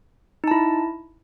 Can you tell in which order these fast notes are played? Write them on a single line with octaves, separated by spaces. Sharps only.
D#4 A5 E4